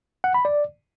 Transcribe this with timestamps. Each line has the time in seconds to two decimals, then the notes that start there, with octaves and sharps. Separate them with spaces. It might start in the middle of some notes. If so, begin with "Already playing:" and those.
0.24 F#5
0.34 B5
0.45 D5